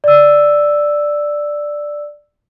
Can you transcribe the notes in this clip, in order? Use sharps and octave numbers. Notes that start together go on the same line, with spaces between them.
D5 E6